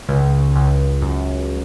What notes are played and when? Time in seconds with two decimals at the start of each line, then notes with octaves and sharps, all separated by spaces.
0.09 C#2
0.56 C#2
1.02 F#2